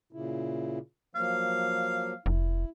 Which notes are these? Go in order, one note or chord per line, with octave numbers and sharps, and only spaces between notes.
A#2 C#3 E4
F3 F#3 A#3 F5
F1 E4